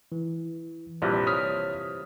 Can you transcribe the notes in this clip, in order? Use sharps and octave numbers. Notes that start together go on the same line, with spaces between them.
E3
A#1 C3 E3 F3 G3
C#5 D#6 F6 B6